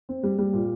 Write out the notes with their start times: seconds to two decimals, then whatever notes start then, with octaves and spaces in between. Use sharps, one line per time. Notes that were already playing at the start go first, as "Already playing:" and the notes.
0.09 C4
0.23 G3
0.38 G3
0.53 A#2